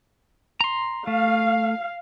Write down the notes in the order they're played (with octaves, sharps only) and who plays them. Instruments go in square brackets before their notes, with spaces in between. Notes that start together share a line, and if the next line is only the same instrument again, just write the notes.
[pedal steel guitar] A#5 C6
[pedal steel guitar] A3 [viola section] F5